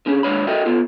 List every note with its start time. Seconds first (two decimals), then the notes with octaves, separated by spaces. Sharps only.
0.06 D3 C#4 G#4
0.23 D#2 G#3 D4 C#5 B5
0.47 F#4 A4 A#4 D#5 E5 G5
0.66 B3 F4 A4